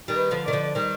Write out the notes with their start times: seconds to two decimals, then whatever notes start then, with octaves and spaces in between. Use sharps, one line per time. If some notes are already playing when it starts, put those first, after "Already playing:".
0.08 D#3 G3
0.16 B4
0.31 D3 F3
0.45 D#3 D5
0.53 D3 F3
0.75 D#3 G3